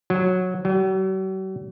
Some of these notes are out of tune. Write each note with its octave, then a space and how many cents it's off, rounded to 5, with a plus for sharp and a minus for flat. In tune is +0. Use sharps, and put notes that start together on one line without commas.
F#3 -10
F#3 +45